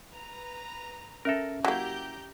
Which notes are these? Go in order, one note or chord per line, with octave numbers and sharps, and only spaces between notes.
B4 A#5
C#4 A4 A#4 E5
F#3 A#3 E4 G4 A#5 G6